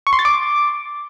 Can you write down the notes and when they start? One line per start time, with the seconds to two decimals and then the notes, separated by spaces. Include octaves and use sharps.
0.07 C#6
0.13 C6
0.19 A6
0.25 D6